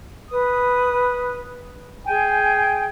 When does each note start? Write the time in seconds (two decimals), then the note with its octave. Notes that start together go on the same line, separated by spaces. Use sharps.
0.29 B4 D#6
2.05 G#4 G5 G#5